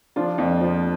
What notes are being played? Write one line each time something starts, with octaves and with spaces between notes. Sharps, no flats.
F3 D4 F4
F2
F3